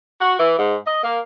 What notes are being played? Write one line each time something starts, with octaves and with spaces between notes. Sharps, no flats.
F#4
E3
G#2
D#5
A#3